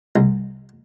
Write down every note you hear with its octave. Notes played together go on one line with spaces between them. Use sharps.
C2